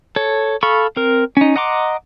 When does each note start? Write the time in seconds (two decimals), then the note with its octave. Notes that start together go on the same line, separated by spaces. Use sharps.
0.16 A4 C#5
0.63 A4 F5 B5 C#6
0.96 C4 A#4
1.37 C#4 D#4
1.56 D#5 F#5 A#5 C6 D6